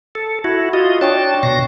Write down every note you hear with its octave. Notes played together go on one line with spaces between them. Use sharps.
A4
E4 F#4
F4 F#4 D#5
D4 C#5 G5 A5 C#6
B2 C#6 A#6 C7